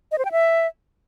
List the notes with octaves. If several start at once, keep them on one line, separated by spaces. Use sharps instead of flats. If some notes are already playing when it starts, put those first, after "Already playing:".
D#5
C5
G5
E5